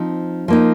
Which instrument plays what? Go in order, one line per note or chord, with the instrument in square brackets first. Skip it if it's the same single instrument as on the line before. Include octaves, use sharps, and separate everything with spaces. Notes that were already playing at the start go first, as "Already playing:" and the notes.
Already playing: [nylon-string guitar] F3 C4 D#4
F3 A#3 D#4